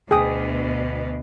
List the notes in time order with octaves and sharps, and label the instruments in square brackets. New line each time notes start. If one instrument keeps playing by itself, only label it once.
[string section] D2 B2 [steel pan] G#4 G5 D#6